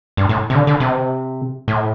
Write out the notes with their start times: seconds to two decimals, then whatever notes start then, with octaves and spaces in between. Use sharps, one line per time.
0.17 G2
0.29 A2
0.50 C3
0.55 D3
0.67 D3
0.80 C3
1.68 A2